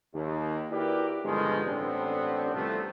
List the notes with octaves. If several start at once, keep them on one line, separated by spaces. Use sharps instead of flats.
D#2
E4 F#4 G4 A#4 B4 D5
G1 B2 D#3 F3 G#3
A1 G2 B3 C4 D4
C2 A2 C3 F3 A3